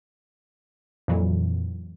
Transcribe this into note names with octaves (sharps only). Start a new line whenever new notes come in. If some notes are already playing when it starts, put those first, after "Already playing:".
F2 A#2 E3 F#3